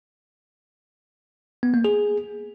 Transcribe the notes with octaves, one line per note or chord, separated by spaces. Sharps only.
B3
A#3
G#4